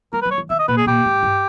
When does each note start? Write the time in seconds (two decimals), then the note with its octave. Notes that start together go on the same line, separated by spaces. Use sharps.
0.13 G3 A#4
0.22 B4
0.25 G3
0.31 C#5
0.38 E3
0.50 D#3 E5
0.59 D#5
0.68 A#2 B4
0.77 G#4
0.86 A#2 G4
1.05 G#2
1.23 G2